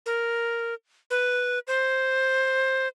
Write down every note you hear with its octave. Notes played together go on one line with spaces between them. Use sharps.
A#4
B4
C5